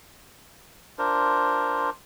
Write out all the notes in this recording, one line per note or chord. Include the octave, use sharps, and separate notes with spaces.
D4 F4 A#4 C5